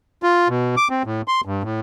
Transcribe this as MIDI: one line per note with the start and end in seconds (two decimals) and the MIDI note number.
0.23 0.48 65
0.49 0.75 47
0.77 0.88 86
0.90 1.03 60
1.05 1.22 45
1.28 1.41 84
1.45 1.63 43
1.63 1.80 45